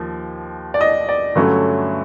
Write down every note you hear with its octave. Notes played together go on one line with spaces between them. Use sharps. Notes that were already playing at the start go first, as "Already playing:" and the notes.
Already playing: D#2 F3
D5
D#5
D5
G2 D3 F#3 A3 C#4